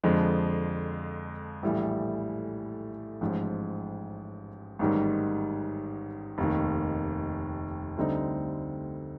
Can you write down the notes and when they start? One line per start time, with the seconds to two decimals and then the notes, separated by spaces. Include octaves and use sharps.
0.03 F2 D3 F3 G#3
1.63 A#1 A2 E3 G3
3.21 A1 G#2 F3
4.79 A1 G#2 D#3 G3
6.38 F1 D#2 D#3
7.97 D2 D3 G3 C4 D#4